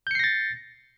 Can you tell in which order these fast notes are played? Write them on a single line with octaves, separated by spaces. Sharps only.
G6 C#7 C7 A#6 A6